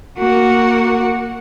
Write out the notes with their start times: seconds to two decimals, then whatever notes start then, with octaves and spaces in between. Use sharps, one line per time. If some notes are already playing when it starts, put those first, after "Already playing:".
0.18 A#3 F#4